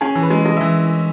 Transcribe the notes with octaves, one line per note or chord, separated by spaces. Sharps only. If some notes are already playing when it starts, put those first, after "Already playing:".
C#4 G#4
E3
B4
G#3
G#3 D#5
E3 E5